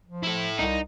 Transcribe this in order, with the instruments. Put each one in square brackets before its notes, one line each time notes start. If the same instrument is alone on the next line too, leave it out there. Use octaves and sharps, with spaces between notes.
[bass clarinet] F3
[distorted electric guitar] E4 A4
[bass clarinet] C2 [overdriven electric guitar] D#4